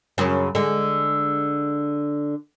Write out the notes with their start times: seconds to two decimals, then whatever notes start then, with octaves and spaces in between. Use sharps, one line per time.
0.18 F#2 C#3
0.55 D3 G#3